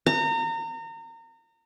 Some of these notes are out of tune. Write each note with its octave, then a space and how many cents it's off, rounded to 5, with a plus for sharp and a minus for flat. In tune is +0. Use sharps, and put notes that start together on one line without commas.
A#5 -30